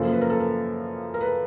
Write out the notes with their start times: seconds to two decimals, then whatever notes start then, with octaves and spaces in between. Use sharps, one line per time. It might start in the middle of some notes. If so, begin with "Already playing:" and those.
Already playing: F#2 C#3 F3 A#3 A4
0.12 B4
0.21 A#4
0.30 A4
0.40 A#4
1.14 A#4
1.21 B4